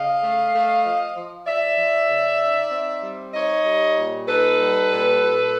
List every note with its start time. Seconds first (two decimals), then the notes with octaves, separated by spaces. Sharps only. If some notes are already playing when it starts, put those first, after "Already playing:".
Already playing: C#3 D#5 F5
0.22 A3
0.53 A3
0.84 F3
1.15 F3
1.47 F3 D5 E5
1.78 F3
2.09 C#3
2.41 D#4
2.72 C4
3.03 G3
3.34 D#4 C#5 D#5
3.65 G3
3.97 A#2
4.28 D#4 A4 B4
4.59 G3
4.91 A#2
5.23 A#2